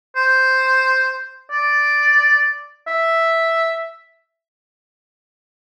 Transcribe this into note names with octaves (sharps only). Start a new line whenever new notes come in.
C5
D5
E5